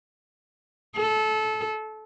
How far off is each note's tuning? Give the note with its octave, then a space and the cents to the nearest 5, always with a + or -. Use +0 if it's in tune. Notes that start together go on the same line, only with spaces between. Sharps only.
A4 -20